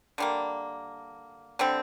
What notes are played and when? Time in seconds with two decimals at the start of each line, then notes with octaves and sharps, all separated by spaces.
0.18 D3 G3 A#3
1.59 D3 G3 C4